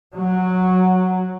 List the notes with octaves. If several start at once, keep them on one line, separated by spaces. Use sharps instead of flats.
F#3